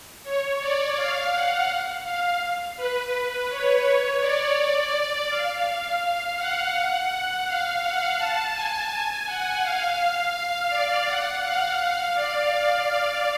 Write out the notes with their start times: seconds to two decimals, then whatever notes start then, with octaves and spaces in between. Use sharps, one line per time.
0.24 C#5
0.60 D5
0.96 F5
1.32 F#5
2.05 F5
2.77 B4
3.12 B4
3.49 C#5
3.85 C#5
4.21 D5
5.29 F5
6.37 F#5
7.46 F5
7.82 F#5
8.18 A5
8.53 G#5
8.90 G#5
9.26 F#5
9.63 F5
10.70 D5
11.07 F#5
11.43 F5
12.14 D5